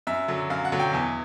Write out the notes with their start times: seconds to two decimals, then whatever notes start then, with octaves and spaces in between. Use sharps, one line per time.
0.07 F#2 E5
0.28 D3 F#3
0.50 F#2 F5
0.65 F#5
0.72 D3 F#3
0.80 G5
0.93 E2 G#5